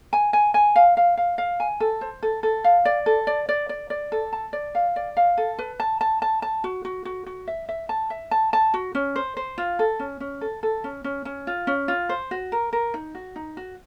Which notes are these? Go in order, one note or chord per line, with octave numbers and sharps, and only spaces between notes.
G#5
G#5
G#5
F5
F5
F5
F5
G#5
A4
C5
A4
A4
F5
D5
A4
D5
D5
D5
D5
A4
A5
D5
F5
D5
F5
A4
B4
A5
A5
A5
A5
F#4
F#4
F#4
F#4
E5
E5
A5
E5
A5
A5
F#4
C#4
C5
C5
F4
A4
C#4
C#4
A4
A4
C#4
C#4
C#4
F4
C#4
F4
C5
F#4
A#4
A#4
D#4
F#4
D#4
F#4